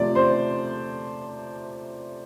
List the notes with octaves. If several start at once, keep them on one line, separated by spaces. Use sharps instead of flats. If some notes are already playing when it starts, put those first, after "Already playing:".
Already playing: C3 F3 A3 D5
C5 C6